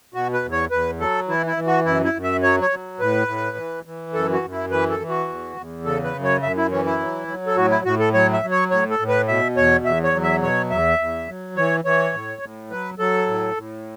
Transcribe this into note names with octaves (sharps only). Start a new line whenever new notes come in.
B2 F#4
B4
E2
C#5
E2 B4
F#3 A4
E3 E4
E4
E3
F#4
F#2 E4
E4
F#2
E5
F#3 C#5
C#5
F#3
A2 B4
A2
E3
E3
F#2 A4
F#4
F#2
E4
E3 B4
A4
E3
F#4
E2
E2
C#3 A4
B4
F#2
C#5
F#2 E5
E4
E3 C#4
E4
F#3
F#3
A4
A2 F#4
E4
A2 F#4
A4
F#3 C#5
E5
F#3
C#5
A2 C#5
A4
A2
B4
B2 E5
E2 C#5
E2 E5
C#5
F#3
E5
B2 C#5
E2 E5
E2
F#3
E3 C#5
E3 C#5
A2
A2
F#3 B4
F#3 A4
A2
A2